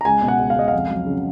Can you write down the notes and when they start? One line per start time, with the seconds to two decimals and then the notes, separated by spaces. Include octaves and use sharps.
0.01 A#5
0.05 C#2 G#5
0.22 B2
0.28 F#5
0.39 C#2
0.50 F5
0.56 C#2 D#5
0.68 F5
0.73 F2
0.90 F#3
1.06 C#3